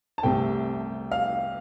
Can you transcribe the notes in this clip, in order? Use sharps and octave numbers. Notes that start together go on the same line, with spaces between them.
A5
C2 C3 A3 G5
F5